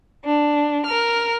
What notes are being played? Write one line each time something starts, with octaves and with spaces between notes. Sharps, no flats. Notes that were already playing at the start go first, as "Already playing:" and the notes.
D4
A#4 F6